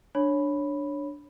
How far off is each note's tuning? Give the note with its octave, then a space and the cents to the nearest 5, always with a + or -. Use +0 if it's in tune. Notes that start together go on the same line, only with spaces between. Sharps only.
D4 +0 C#5 -5 B5 +0